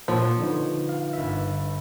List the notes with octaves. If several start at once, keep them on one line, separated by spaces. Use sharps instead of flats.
A#2 F3 C5 C#5 C6
D3 D#4 B4
F5
G1 E5